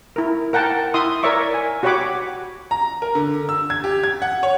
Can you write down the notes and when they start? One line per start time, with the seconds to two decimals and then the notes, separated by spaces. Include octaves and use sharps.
0.16 E4 A#4
0.53 A#4 F#5 G5 A5
0.94 E4 E5 C6 D#6
1.23 A#4 C#5 D5 E5 C#6 D6
1.54 G#5
1.83 F#4 G4 C#5 F#5 B5 D6
2.71 A#5
3.02 A#4
3.15 D3
3.49 E6
3.70 G#6
3.84 G4
4.04 G#6
4.22 F#5
4.43 C#5